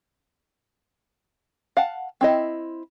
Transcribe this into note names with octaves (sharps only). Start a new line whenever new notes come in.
F5 F#5 A5
C4 E4 D#5